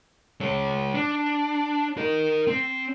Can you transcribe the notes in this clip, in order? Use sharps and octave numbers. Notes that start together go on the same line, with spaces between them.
G#3 C#5
D4
A#4 D#5
C4